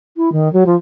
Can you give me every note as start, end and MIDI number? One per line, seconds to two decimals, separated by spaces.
0.17 0.32 64
0.32 0.51 51
0.53 0.64 54
0.66 0.75 53